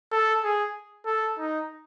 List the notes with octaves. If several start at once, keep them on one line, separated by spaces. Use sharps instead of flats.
A4
G#4
A4
D#4